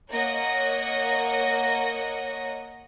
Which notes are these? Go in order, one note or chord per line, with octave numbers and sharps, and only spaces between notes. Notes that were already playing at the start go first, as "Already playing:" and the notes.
A#3 C#5 D#5 F#5 A#6